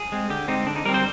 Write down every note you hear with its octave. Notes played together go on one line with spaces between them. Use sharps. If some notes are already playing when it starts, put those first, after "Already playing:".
Already playing: G#4
G#3 C4
D3 G4
G#3 C4 D#4
D3 D4
D#4
G3 C4 A#4
C5